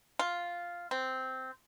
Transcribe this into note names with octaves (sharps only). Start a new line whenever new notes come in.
F4
C4